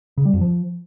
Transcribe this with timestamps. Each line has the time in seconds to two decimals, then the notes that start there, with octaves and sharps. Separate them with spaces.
0.18 C#3
0.25 G3
0.33 F2
0.41 F3